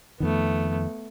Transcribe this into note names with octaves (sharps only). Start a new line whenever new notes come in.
F2 D#3 A3 B3